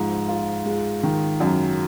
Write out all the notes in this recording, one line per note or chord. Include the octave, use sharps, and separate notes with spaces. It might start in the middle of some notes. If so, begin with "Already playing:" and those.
Already playing: G#2 F3
F4
G#3
D#3
F#2